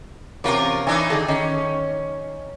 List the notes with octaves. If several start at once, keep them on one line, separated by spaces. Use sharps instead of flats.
E2 C3 C#4 F4 A#4
E3 D4 D#4 G#5
D#3 G#4 A4
D#3 C#4